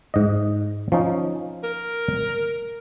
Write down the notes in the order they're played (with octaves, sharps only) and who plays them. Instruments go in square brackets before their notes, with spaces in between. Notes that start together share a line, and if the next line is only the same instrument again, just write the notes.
[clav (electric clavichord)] G#2 D#5
F3 C#4 D#4
[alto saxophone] A#4